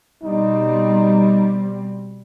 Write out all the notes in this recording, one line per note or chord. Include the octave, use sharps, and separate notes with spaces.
B2 G3 C4 D#4